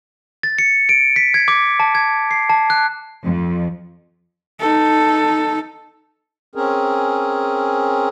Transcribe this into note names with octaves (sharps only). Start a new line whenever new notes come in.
A6
C#7
D7
B6
G#6
D6
A5
G#6
C7
A5
F#6
F2
D#4 A4
C4 C#4 G#4 A#4